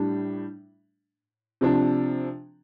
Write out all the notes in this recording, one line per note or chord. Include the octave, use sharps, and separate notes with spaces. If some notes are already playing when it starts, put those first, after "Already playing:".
Already playing: A2 G3 D4
C3 F3 D4